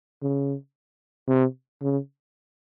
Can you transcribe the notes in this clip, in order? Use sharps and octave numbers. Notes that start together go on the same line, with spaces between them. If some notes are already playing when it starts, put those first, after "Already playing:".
C#3
C3
C#3